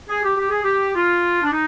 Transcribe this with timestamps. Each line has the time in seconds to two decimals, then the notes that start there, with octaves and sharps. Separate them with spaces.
0.08 G#4
0.23 G4
0.37 G4
0.50 G#4
0.62 G4
0.94 F4
1.42 D4
1.52 D#4